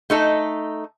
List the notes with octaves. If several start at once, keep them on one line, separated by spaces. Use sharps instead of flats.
A3 D#4 A4